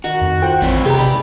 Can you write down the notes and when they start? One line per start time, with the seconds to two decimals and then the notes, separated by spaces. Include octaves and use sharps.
0.04 D#3 F#4 A#5
0.21 F2
0.42 F4 C5 G5
0.62 A1 G2 C4 E4 B4 C#5
0.85 C3 B3 G4 G#4 A#5
0.98 G#3 D#4 D5 B5